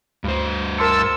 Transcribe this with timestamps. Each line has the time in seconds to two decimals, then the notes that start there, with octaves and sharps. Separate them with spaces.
0.24 D2 G2 C5
0.78 A#4 A5 C6 E6 C#7